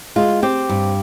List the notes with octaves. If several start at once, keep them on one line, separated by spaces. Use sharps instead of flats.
G#3 F4
C4 G4
G2